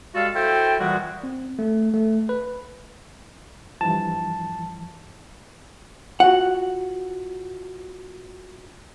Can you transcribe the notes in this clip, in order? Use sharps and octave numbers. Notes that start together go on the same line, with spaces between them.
G3 G#3 F#4 A4 F5
E4 F#4 A4 C5 E5 G5
A#2 E3 G3 G#3 F#4
C4
A3
A3
B4
G2 E3 F3 A5
F4 F#4 F#5